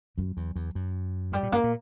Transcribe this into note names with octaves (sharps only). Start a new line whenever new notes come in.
F#2 F#3
E2
E2
F#2
G2 G3
A#2
G2 A#3
A#2